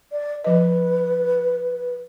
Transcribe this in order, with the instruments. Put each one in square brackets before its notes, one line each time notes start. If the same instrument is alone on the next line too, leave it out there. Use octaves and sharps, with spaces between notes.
[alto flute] D5
[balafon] F3 D#5 [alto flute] B4